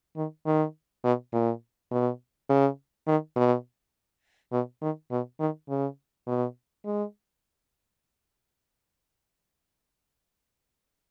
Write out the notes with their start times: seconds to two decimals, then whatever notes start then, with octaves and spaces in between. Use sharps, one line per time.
0.16 D#3
0.46 D#3
1.04 B2
1.33 A#2
1.91 B2
2.49 C#3
3.07 D#3
3.36 B2
4.52 B2
4.82 D#3
5.11 B2
5.40 D#3
5.69 C#3
6.27 B2
6.85 G#3